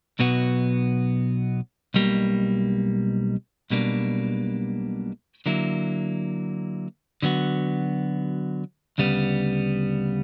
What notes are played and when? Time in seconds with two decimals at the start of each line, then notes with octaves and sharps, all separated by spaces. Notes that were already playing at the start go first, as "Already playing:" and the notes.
0.19 B1 B2 F#3 B3 F#4
1.94 B1 B2 G3 A#3
3.70 B1 B2 G3 A#3 D4
5.46 D3 F#3 A#3 E4
7.22 D3 F#3 B3 F#4
8.98 D2 C#3 G3 B3